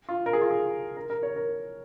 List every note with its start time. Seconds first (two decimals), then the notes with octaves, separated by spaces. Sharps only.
0.09 F4
0.26 A#4
0.33 G#4
0.42 F4
0.51 G#4
0.97 A#4
1.10 A#4
1.23 C#5
1.36 A#4